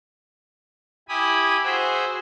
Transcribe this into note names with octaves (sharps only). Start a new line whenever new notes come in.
E4 G4 G#5 B5 D#6
F#4 G#4 C5 E5